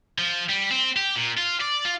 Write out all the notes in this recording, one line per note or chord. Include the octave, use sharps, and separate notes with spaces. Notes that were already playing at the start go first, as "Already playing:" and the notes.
F3
G3
C4
G4
A#2
F4
D5
F4